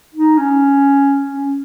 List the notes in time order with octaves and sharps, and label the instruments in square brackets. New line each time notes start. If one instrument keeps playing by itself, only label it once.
[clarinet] D#4
C#4
C#4